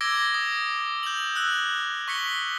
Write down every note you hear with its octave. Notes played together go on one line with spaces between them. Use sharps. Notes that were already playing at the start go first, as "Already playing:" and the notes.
D6 E6 G#6 A#6 D7 G7
D#6
G6 F#7
E6 F#6 F#7
C#6 B6 C#7 G7